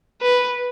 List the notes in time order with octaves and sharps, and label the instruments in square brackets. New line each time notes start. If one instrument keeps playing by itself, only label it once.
[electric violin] B4